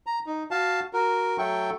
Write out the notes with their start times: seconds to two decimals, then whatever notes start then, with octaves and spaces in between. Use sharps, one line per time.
0.06 A#5
0.26 D#4
0.51 F#4 F5 A5
0.93 F#4 A#4
1.38 F#3 A3 A4 G5 C#6